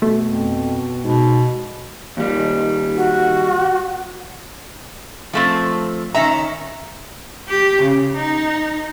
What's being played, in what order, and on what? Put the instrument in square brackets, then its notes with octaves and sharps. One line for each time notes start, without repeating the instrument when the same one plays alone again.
[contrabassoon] B2 [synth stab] A3
[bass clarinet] F2
[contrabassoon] G#2 [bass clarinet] B2
[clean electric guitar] D#2 G3
[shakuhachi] F#4
[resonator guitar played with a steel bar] F3 A3 C4
D#3 C#4 E5 A#5
[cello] G4
C#3
D#4